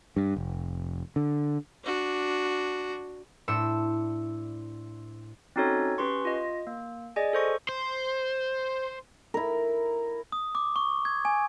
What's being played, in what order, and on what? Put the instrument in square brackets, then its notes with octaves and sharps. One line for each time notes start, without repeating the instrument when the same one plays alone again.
[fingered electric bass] G2
F1
D3
[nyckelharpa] D4 F#4
[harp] A2 D4 C5 E6 C#7
[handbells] C4 C#4 D#4 F#4 A4 C#5
C#4 G4 B4 C6 C#6
F4 D#5
A#3
G#4 D5 D#5 G#5
A4 C5 C#6
[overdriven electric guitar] C5
[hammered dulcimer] E4 A#4
[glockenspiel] D#6
D6
C#6
G#6
G#5